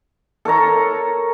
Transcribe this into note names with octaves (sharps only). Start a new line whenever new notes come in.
A4 A#4 C#5 A#5